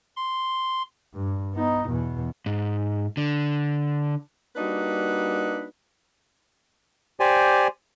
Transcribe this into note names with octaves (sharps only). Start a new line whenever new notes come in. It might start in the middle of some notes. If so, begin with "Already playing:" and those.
C6
G2
B3 D#4
E2 B2
G#2
D3
G3 A#3 D4 D#4 F#4 B4
G4 C5 D5 G#5